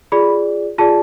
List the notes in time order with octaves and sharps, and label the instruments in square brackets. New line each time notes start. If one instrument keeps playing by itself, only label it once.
[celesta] F4 G#4 D5 B5
F4 G#4 D5 A5